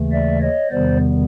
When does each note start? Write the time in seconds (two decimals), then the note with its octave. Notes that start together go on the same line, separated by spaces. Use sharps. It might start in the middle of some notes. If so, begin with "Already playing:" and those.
Already playing: D#2 C#3 E3 A3
0.12 D5 E5
0.41 C#5 D#5
0.71 E2 C3 D#3 G3 B3 C5 D5